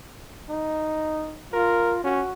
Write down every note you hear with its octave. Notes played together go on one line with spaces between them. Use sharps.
D#4
F4 A#4
C#4 F#4